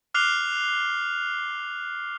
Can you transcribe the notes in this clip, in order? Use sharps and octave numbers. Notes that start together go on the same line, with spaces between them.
D6 F6 F#6 C7 F7 G7